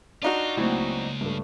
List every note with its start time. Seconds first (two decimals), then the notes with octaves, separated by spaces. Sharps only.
0.22 D4 D#4 F4 F#4
0.57 C#2 F#3 A3 A#3 C4 E4
1.21 G2 A3